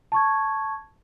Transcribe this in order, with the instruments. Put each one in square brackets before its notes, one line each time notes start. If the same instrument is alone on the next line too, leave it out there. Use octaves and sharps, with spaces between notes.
[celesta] A5 C#6 G#6